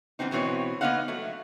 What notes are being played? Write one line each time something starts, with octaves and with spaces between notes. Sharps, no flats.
E3 G3 B3 C4 D#4
G#2 B2 E3 C4 C#5
A#3 B3 D#4 D#5 F5 F#5
F#3 A3